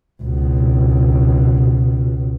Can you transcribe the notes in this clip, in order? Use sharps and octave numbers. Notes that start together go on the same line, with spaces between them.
C#2 B2